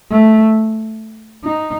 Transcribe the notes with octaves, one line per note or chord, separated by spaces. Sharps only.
A3
D#4